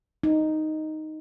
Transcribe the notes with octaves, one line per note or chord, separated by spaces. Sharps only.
D#4